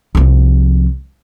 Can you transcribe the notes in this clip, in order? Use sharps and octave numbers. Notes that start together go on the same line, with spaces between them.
C2 F3